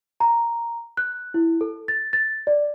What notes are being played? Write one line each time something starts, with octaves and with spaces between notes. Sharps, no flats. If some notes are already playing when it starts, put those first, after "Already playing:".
A#5
F#6
E4
A4
A6
A6
D5